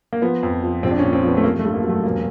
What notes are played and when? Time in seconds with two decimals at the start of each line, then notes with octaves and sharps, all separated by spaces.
0.13 A#3
0.22 F3 B3
0.43 F2
0.63 F3
0.83 A#1 C4
0.91 D4
0.99 C#4
1.04 A#2
1.13 C4
1.23 F3
1.28 B3
1.37 A3
1.43 G2 A#3
1.59 A3
1.64 G2
1.74 A#3
1.84 F#3
1.89 A3
2.04 E1 A#3